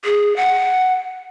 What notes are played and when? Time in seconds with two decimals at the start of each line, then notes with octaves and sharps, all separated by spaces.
0.04 G#4
0.36 F#5